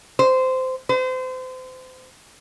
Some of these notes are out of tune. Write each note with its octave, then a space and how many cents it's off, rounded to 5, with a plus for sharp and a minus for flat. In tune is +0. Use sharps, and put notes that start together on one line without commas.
C5 -15
C5 -30